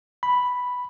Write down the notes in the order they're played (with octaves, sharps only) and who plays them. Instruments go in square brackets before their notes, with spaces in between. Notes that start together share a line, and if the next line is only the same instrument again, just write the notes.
[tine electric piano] B5